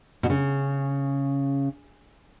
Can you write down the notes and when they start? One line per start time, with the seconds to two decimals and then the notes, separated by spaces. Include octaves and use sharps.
0.23 B2
0.30 C#3